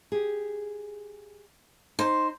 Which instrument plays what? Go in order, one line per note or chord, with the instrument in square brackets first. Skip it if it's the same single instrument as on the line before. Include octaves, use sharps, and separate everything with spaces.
[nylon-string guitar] G4 G#4
[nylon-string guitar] D#4 [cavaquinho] C5